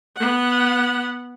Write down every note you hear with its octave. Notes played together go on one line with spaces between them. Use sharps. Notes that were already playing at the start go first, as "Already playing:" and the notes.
B3 F#5